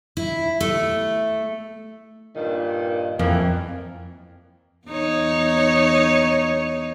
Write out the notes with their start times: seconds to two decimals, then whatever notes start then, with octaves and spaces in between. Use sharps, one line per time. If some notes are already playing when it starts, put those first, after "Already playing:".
0.17 E4
0.61 A3
2.36 G2 A#2 D#3
3.19 F2 E3 F3 A#3
4.88 E2 D#4 C#5